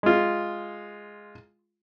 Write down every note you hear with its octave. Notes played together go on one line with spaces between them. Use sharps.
G#3 F4